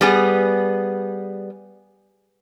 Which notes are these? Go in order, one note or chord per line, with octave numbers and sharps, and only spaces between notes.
G3 B3 G#4